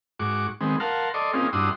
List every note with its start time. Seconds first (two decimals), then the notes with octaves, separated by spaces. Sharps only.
0.19 G#2 F#4 C#6 D6
0.61 D#3 G#3 B3 C4
0.80 A#4 F5 F#5 A5 C6
1.14 A4 D5 D#5 C6 C#6
1.34 A#3 C4 C#4 D#4 F4 G#4
1.53 G2 D4 E4 F#4 C6 D#6